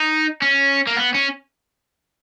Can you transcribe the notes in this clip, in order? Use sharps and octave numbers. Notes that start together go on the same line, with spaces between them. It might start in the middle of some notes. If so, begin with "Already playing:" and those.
Already playing: D#4
C#4
A#3
B3
C#4